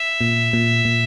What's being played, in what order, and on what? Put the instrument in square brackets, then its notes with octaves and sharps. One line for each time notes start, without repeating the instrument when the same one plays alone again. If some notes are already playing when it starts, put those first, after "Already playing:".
Already playing: [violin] E5
[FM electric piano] A#2
A#2
A#2